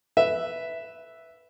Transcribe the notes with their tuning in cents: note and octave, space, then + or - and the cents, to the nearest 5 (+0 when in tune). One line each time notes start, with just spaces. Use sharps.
B4 +0 E5 +0